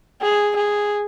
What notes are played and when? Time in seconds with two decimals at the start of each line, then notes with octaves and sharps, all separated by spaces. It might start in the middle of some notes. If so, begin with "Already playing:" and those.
0.22 G#4
0.56 G#4